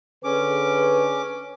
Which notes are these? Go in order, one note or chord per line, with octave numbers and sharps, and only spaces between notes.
D3 C#4 G#4 B4 D6